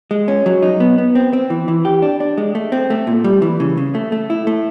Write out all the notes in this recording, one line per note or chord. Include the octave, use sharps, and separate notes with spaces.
G#3
C#4
F#3
D#4
B3
B3
C4
C4
E3
E3
G4
D4
D4
G#3
A3
C4
A3
A#2
G3
E3
C#3
C#3
A3
A3
E4
A3